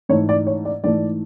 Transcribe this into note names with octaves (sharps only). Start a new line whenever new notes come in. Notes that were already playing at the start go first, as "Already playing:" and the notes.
G#2 E3 A3 C#5
D5
C#5
D5
G#2 E3 A3 D5